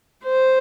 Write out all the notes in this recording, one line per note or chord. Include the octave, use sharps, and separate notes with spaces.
C5